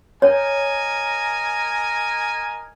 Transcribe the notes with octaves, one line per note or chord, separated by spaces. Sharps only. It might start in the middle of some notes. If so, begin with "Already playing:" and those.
A#4 C#5 D#5 G#5